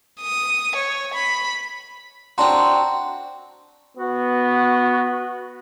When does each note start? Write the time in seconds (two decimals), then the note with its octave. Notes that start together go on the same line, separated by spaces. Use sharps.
0.21 D#6
0.76 C#5
1.14 B5
2.38 C4 D4 F#4 A5 A#5 C6
3.97 B3 F#4